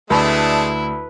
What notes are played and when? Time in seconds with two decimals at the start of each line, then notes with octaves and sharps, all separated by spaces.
0.10 D2 G#3 A3 D4 E4 B4